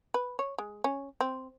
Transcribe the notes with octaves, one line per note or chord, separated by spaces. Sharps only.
B4
C#5
G#3
C#4
C4